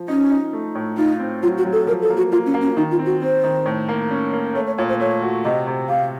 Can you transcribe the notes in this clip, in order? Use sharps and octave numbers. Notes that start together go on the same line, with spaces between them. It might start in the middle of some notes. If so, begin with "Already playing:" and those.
Already playing: F3
C#4 D#4
D#4
A3
A2
D#4 F4
C4
F#3 F4
F#4
F#3
A4
F3 A#4
A4
A#3
F#4
A#3 F4
C#4
A#3
C#4
D#3 D#4
F4
C4
F#4
C4 C5
D#3
A2
A#3
C#4
A#3
A3 C#5
C#5
A#2 C#5
C5
A3 C#5
F#4
C3 D#5
C3
C3 F5